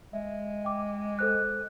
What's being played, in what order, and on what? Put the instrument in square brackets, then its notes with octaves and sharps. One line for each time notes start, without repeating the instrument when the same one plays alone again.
[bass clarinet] G#3 [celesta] E5
[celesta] G5 D6
A4 C5 F#6